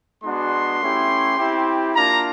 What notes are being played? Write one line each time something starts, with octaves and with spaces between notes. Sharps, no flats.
G#3 B3 D4 F#4 C6
A3 C#4 E4 G4
C4 E4 G4
A#3 D4 F4 A#5